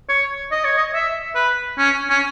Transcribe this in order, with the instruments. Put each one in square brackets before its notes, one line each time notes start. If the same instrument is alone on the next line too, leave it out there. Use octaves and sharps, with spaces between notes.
[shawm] C#5
D#5
C#5
D#5
E5
B4
C#4
C#4